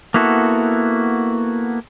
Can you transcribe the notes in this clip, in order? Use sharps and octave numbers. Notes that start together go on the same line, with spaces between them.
A#3 B3 E4 F#4 A4